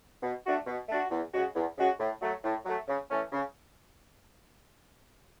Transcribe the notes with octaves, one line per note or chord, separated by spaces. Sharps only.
B2
A3 D4 F#4
B2
A3 D4 F#4
E2
C#3 G#3 C#4 F#4
E2
C#3 G#3 C#4 F#4
A2
F#3 A3
A2
F#3 A3
C#3
E3 A3 C#4
C#3